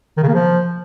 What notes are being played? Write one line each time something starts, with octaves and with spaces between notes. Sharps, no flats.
D#3
C#3
A#3
F3